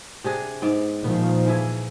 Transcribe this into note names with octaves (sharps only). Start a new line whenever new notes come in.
C3 D4 G#4
G#2 B3 D5
A#2 D#3 F3 B3
E3 E4 G#4